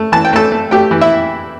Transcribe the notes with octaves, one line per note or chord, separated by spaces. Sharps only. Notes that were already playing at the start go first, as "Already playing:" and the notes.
Already playing: A3
E3 A5
G5
A3 A4 A5
A3
A3 G4 G5
E3
E4 E5